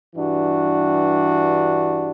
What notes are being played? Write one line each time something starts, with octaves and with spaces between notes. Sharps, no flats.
G2 E3 G3 D4 F#4